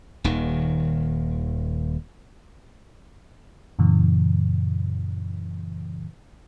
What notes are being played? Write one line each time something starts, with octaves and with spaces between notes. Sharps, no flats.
D#1 D#2 D#3
F#2 A#2 C#3 E3